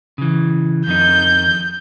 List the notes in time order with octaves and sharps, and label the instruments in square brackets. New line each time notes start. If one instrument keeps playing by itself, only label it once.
[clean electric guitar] C#3 E3
[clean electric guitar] F2 D#3 D#4 [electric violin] G6